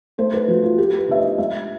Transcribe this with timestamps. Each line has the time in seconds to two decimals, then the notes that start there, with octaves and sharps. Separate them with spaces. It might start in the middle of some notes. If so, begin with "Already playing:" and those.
0.18 A3 C5
0.34 B4
0.48 F3 F#4
0.63 F4
0.78 A3 G4
0.98 B4
1.08 D3 E5
1.18 D#5
1.38 G#3 E5